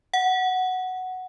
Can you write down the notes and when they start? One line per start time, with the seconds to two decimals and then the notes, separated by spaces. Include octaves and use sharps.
0.14 F#5